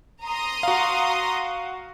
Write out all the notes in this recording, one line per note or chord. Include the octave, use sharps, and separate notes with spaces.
A#5 C6 D#6
F#4 F5